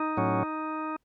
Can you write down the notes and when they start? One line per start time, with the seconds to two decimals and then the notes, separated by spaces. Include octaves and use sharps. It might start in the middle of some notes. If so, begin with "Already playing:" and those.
Already playing: D#4
0.17 A2 F#3 C#4